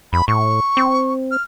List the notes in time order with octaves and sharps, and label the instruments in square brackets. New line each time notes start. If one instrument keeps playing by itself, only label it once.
[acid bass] F2 [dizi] B5
[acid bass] A2 [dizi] C#6
[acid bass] C4
[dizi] F6